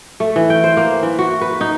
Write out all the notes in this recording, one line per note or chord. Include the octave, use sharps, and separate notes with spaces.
A3
E3
G5
C5
A#3
E3
F#4
B4
D#4